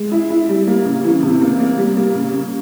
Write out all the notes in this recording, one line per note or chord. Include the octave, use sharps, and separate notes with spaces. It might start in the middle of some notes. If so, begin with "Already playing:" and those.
Already playing: G#3
E4
E4
G3
A#3
C#3
E3
C3
A#3
A#3
G3
A#3
C#3
C#3